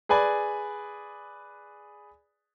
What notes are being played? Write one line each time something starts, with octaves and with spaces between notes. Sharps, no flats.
G#4 B4 D5 G#5 B5